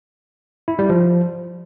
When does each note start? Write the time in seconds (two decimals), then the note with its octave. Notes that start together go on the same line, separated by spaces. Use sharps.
0.68 E4
0.79 G3
0.90 F3